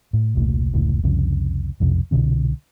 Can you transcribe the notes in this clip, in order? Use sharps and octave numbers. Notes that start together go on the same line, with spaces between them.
A2
E1 C2 A#2 A3
F1 C#2 A2
C2 F2 C#3
B1 F2 C3
C2 B2 D3 C4